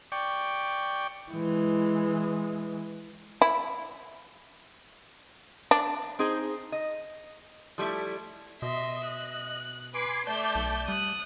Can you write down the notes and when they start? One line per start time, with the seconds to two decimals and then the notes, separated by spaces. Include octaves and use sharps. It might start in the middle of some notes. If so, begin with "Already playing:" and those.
0.12 D5 G5 C#6
1.32 E3 G#3
3.42 E4
5.71 D4
6.19 C4 D#4 G#4 C5
6.72 D#5
7.78 F3 G3 A3 E4
8.62 B2 D#5 E5 C6
9.05 F#6
9.94 B4 G#5 C6 D6
10.27 A3 D5 A5 G6
10.55 B1
10.88 G3 D#6 F#6